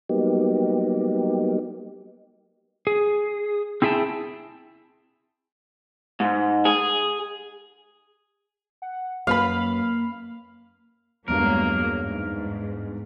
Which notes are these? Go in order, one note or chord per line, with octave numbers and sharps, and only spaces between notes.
F#3 G3 A#3 B3 D#4 G4
G#4
C4 E4 G#4 E5 G5 A5
G#2
G#4
F#5
F#2 A#3 B4 F5 B5
E2 G2 F#3 G#3 A#3 A#4
G#2